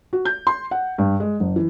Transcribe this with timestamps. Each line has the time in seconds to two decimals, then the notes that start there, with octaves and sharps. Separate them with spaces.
0.13 F#4
0.25 G6
0.47 C6
0.71 F#5
0.98 G2
1.20 G#3
1.40 F#1
1.56 E3